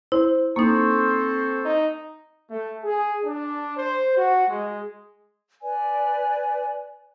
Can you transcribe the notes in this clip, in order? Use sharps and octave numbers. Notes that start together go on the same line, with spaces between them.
E4 C5
A#3 C4 D#4 A4 C5 C#6
D#4
A3
G#4
D4
C5
F#4
G#3
B4 D5 G#5